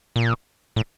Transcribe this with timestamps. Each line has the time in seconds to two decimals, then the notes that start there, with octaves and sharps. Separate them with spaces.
0.16 A#2
0.76 A2